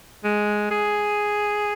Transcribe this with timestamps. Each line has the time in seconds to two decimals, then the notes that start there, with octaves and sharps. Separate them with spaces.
0.24 G#3
0.71 G#4